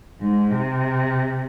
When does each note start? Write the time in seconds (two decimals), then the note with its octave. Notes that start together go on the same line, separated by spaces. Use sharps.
0.21 G#2
0.51 C3